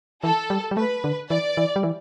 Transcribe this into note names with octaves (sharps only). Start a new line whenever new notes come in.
E3 A4
G3
G3
A3 B4
D3
E3 D5
E3
G3
E3